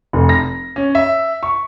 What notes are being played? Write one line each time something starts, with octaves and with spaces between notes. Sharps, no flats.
F1
A#6
C#4
E5
C#6